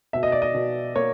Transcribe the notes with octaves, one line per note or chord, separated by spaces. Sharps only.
B2 E5
D#5
D5
D#5
B2
A#3 C#5